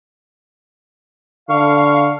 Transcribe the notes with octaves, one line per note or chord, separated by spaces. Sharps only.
D3 F5 C#6